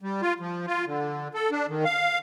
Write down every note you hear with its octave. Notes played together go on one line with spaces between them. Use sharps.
G3
F4
F3
F4
D3
A4
D4
D#3
F5